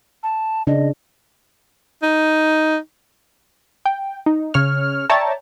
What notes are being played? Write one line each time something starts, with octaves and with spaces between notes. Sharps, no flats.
A5
C#3 D4 D#5
D#4
G5
D#4
C#3 C#5 F6
C#5 D5 E5 G5 A5 A#5